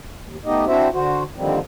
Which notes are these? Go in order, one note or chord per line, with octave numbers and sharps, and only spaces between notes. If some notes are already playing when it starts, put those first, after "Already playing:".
D#2
A3 B3 D#4 G4 D#5
C4 D4 E4 F#4 C5 E5
D3 F#4 C5
D3 D#3 F3 G3 A#3 C4